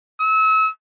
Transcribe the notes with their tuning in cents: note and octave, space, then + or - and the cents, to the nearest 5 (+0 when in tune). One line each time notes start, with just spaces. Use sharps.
E6 -35